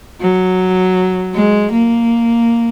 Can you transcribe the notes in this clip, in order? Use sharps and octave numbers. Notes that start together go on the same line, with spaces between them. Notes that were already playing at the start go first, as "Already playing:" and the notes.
F#3
G#3
A#3